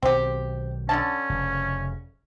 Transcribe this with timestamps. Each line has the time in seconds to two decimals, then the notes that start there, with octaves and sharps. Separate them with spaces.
0.02 B1 D#3 C4 G4
0.89 D3 C#4 D4 A5
1.29 F1 C#3